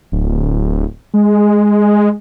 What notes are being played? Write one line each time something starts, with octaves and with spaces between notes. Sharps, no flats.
D1
G#3